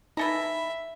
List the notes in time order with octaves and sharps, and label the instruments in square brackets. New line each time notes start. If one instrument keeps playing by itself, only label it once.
[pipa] E3 A4 A#5 [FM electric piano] D#4 B5 [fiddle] E5